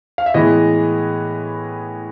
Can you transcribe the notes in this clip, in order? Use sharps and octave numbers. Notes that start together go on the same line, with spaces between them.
F5
E5
A2 E3 G#3 B3 D#5